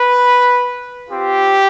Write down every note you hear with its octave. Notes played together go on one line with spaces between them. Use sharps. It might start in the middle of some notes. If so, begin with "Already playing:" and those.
Already playing: B4
C4 F4 G4